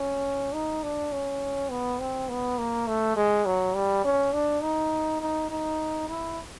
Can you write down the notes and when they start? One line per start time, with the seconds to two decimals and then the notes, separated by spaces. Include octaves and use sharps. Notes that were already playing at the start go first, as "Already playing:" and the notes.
Already playing: C#4
0.54 D#4
0.83 D4
1.12 C#4
1.71 B3
2.00 C4
2.29 B3
2.58 A#3
2.88 A3
3.17 G#3
3.46 F#3
3.75 G3
4.04 C#4
4.33 D4
4.63 D#4
5.21 D#4
5.50 D#4
6.09 E4